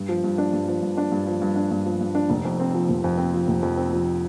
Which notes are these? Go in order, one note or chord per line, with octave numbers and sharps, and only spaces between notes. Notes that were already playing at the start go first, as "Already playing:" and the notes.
Already playing: G2
F3
G2
D4
G2
F3
G2
D4
G2
F3
G2
D4
G2
F3
G2
D4
F1
F2
C4
F3
F1
F2
C4
F3
F1
F2
C4
F3